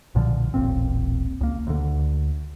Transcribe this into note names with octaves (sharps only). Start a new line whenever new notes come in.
B1 A#2 D3 F3
D#1 A1 A#2 C4
C#2 A#3
D2 D3